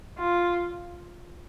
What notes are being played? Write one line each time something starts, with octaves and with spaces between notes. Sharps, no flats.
F4